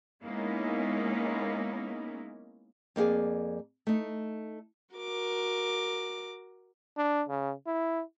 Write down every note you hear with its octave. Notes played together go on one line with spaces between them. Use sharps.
G#3 A#3 B3 C#4 D#4 E4
F2 A#3 D#4 G#4 D5
A3 D#4
F#4 A#4 D6
D4
C#3
E4